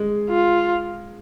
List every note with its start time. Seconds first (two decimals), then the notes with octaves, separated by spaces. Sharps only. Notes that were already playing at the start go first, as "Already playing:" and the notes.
Already playing: G#3
0.30 F4